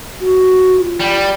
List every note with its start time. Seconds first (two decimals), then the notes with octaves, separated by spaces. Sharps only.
0.20 F#4
0.78 F4
1.00 G3